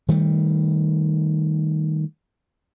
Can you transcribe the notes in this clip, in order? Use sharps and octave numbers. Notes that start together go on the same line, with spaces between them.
D#3 G3 A3